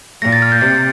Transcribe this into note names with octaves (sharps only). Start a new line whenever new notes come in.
A#2 A#6
A6
F6
G6
C3 A6